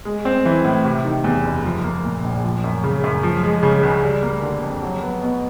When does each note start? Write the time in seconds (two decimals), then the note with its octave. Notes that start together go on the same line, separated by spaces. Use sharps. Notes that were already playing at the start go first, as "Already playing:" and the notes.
0.05 G#3
0.25 C4
0.45 E3
0.65 A2
0.85 C3
1.04 D#3
1.24 E2
1.44 F#1
1.64 F3
1.84 A#3
2.04 A#2
2.24 A#1
2.44 F3
2.64 F#2
2.84 C#3
3.04 F#2
3.23 F3
3.43 G#3
3.63 C#3
3.83 C#2
4.03 G3
4.23 A#3
4.42 D3
4.63 F2
4.82 F#3
5.02 B3
5.22 B2